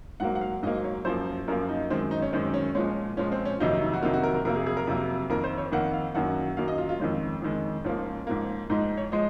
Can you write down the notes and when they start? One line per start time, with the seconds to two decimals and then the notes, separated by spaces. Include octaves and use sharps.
0.20 G#2 F#3 A#3 F#5
0.35 F#5
0.41 F5
0.63 G#2 F#3 A#3 D#5
0.84 C#5
1.05 F#2 F3 A#3 C5
1.48 F#2 F3 A#3 A#4
1.69 D#4
1.90 F#2 D#3 G#3 C4
2.11 D#4
2.22 C#4
2.32 F#2 D#3 G#3 C4
2.54 C#4
2.75 A#2 F3 G#3 C#4
3.17 A#2 F3 G#3 C#4
3.32 C4
3.45 C#4
3.60 F2 C3 D#3 F#3 A#3 D#4
3.81 D#4
3.93 F#4
4.02 F2 C3 D#3 F#3 A#3 F4
4.13 F#4
4.23 A#4
4.34 A#4
4.45 F2 C3 F#3 A#3 A#4
4.56 G#4
4.66 G#4
4.77 A#4
4.87 F2 C3 F#3 A#3
5.30 F2 D#3 A#3 A#4
5.44 C5
5.58 C#5
5.72 F2 D#3 A#3 F#5
5.93 F5
6.15 F#2 D#3 F#3 A#3 F#5
6.57 F#2 D#3 F#3 A#3 F5
6.68 D#5
6.78 F4
6.89 F4
6.99 F2 D#3 G#3 C#4
7.42 F2 D#3 G#3
7.84 G#2 F3 A#3 C#4
8.27 G#2 F3 A#3
8.70 G#2 F3 G#3 D#4
8.97 C#5
9.12 F3 G#3 D#5